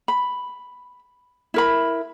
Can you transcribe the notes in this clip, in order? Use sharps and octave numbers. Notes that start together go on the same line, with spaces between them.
B5
E4 A#4 B5